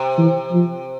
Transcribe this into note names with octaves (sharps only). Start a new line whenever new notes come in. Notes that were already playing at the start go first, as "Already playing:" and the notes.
Already playing: C3
E3
F3